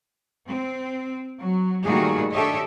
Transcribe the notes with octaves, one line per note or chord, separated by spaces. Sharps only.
C4
F#3
A#2 D#3 G3 A3 F#4 G#4
D4 G4 A4 C#5 D#5 E5